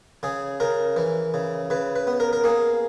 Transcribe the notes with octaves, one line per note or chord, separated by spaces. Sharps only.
C#3 G#4
C#3 A#4
E3
C#3
C#3 B4
B4
B3
A#4
A#4
A#3 G#4